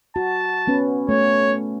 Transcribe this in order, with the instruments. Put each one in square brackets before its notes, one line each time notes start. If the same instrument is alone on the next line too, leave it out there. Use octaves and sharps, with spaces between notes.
[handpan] F#4 [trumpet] A5
[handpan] B3 C#4 B4
[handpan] A3 [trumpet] C#5